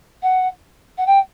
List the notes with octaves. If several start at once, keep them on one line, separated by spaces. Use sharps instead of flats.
F#5
F#5
G5